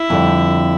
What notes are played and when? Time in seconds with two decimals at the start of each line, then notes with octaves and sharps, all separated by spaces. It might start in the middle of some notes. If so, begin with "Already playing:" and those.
Already playing: E4
0.10 F2 D3 G3